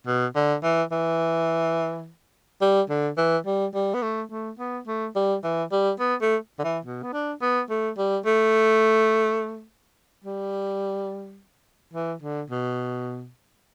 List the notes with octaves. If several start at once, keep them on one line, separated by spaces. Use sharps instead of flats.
B2
D3
E3
E3
G3
D3
E3
G3
G3
B3
A3
A3
B3
A3
G3
E3
G3
B3
A3
D3
E3
B2
B3
D4
B3
A3
G3
A3
G3
E3
D3
B2